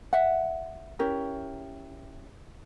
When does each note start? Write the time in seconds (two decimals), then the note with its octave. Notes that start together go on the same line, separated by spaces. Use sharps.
0.13 E5 F#5
0.99 C#4 E4 G4 A#4